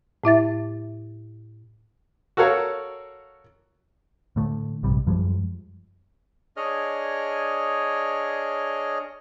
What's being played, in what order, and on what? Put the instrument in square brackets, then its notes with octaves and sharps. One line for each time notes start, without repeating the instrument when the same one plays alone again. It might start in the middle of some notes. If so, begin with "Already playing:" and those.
[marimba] A2 E4 E5 A6
[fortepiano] F#4 A4 A#4 C#5 F5
[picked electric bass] A2 D3 A3
A#1 G2 C3 G3
F#2 F3 G3 G#3
[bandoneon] D4 G#4 C#5 D#5 F6